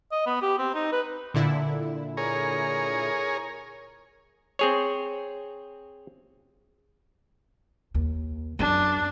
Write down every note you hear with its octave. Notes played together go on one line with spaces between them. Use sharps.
D#5
B3
G4
C4
D#4
B4
A#2 D3 E4
G#4 A#4 C#5
C4 G#4 C#5
D#2
F#2 D4